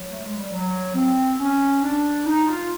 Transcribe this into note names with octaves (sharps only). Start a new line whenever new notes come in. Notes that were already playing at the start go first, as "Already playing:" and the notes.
Already playing: F#3
A3
G#3
G3
F#3
C4
C#4
D4
D#4
F4